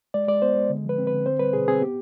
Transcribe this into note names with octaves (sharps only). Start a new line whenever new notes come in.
G#3 D5
G#3 D5
B3 C5
G#3
D3
F3 B4
C4
B4
D3
C4 C5
G3 B4
B2 G#4
C4 G#4
B3 G4